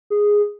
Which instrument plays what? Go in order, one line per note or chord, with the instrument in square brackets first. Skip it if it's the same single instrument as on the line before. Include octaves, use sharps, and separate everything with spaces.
[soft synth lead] G#4